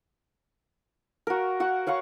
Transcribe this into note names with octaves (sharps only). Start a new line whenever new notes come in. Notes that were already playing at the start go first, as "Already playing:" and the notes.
F#4 A#4
F#4 F#5
C#5 F5 F#5 C#6